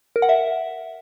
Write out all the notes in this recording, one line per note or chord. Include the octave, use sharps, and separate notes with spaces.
A#4
F#5
E5